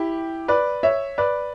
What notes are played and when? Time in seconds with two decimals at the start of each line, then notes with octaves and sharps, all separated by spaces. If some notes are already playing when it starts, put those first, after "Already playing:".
Already playing: E4 G4
0.48 B4 D5
0.83 C#5 E5
1.18 B4 D5